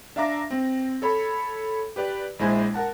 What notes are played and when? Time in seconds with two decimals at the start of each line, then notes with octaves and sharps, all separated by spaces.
0.16 D4 E5 F5 A#5 D6 A#6
0.51 C4
1.02 A4 C#5 B5
1.96 G4 B4 D5
2.39 A#1 G#3 E4 C5 G#5
2.74 A#4 F#5 A5